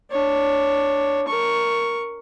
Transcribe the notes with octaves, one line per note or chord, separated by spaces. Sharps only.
D4 C#5
A#4 C#6